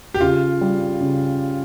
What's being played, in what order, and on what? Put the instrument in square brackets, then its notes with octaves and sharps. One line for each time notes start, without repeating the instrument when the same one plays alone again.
[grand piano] G4
[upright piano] C#3 [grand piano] F4
[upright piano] G3
C#3